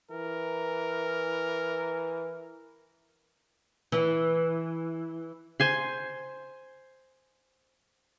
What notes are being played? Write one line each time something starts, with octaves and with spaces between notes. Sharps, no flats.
E3 A#4
E3
C5 G#5 C6